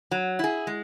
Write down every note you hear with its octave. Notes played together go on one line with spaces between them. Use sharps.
F#3
E4 G#4
G#3